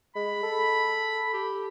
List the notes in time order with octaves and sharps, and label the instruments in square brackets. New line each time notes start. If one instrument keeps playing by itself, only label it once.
[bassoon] G#3 [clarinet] B5
[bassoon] A4
[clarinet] G4